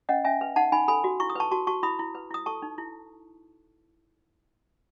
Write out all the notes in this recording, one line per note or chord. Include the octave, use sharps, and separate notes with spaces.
C#4 D#5 F#5
C#4 E5 G#5
B4
D#4 F#5 A5
D#4 G#5 B5
A4 G#5 B5
F#4
E4 C#6
D#6
B4 A5 C#6
F#4 A5 C#6
F#4 A5 C#6
E4 B5 D#6
E4
B4
E4 D#6
A4 A5 C#6
D#4
E4